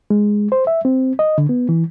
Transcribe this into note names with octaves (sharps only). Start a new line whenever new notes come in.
G#3
C5
E5
C4
D#5
D3
B3
E3